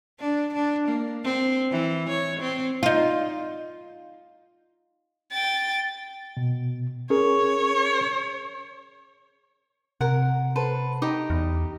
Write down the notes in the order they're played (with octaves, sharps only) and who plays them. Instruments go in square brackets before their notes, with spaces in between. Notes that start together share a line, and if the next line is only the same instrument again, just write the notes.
[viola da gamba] D4
D4
A#3
C4
E3
C#5
C4
[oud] D#4 F4
[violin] G5 A6
[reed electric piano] B2
[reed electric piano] C#4 G#4 A#4 [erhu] C#5
[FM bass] C3 [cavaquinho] A#4 F#5
[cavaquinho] A4 B4 C5
D#4 G4 D#6
[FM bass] E2